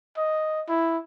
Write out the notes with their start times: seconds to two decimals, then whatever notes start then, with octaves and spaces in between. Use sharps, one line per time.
0.17 D#5
0.69 E4